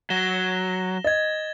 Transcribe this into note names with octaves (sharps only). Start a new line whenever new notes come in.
F#3 A#6 E7 G7
D#5 G#6 A6